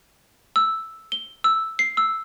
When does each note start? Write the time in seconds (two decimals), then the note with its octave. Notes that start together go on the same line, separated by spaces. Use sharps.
0.56 E6
1.12 G7
1.44 E6
1.79 C7
1.97 E6